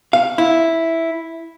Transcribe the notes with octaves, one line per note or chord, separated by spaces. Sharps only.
F5
E4